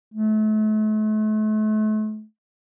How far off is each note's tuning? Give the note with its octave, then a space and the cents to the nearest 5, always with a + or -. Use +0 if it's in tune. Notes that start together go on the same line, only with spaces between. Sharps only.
A3 -40